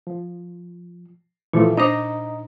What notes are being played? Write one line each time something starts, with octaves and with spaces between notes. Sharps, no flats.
F3
A#2 E3 F3 A3
D4 D#4 C5 D#5 A#5